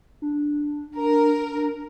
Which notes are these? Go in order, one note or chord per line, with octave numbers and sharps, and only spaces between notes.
D4
A#4